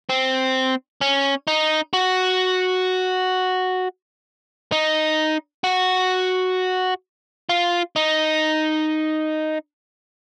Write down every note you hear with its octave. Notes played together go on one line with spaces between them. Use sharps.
C4
C#4
D#4
F#4
D#4
F#4
F4
D#4